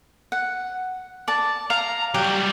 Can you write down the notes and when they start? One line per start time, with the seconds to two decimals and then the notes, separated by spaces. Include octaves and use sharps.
0.32 F#5
1.28 D5 A5
1.70 F5 A#5
2.14 F#3 G3 G4